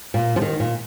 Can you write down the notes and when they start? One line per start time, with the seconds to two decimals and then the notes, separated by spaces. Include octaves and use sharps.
0.14 A#2
0.36 F3
0.42 D#3
0.60 A#2